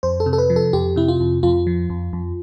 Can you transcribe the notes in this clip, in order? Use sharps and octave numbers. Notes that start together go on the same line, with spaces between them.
F2 C5
A4
C3
A4
B4
F3
A4
F2 G4
C3 E4
F4
F2
F2 F4
F3
F2
F2